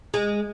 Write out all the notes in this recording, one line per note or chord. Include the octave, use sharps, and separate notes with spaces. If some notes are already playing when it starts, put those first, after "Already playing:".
G#3